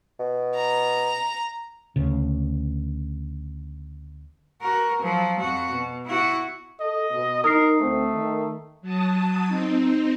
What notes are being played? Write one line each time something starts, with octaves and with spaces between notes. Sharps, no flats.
B2
A#5
D2 C#3
F#4 A#4
F3 F#3
F2 F#4
B2
E4 F#4
A4 D#5
B2
D#4 A#4 D#6 C7
D2 A3 C4
D#3
F#3 A5 D#6
C4 D#4